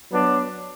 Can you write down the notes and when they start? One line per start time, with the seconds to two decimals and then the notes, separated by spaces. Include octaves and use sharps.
0.11 F#3 B3 D4